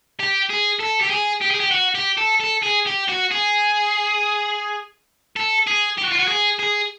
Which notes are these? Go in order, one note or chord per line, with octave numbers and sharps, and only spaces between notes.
G4
G#4
A4
G4
G#4
G4
G#4
G4
F#4
G4
A4
A4
G#4
G4
F#4
G#4
A4
G#4
G4
F#4
F4
F#4
G#4
G#4